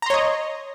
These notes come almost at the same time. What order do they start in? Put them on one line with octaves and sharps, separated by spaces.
A#5 C6 C#5 D#5